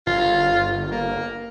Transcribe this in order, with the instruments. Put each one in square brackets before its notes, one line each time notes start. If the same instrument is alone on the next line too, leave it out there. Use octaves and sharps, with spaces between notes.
[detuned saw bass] G1 [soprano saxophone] F4
[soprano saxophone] A#3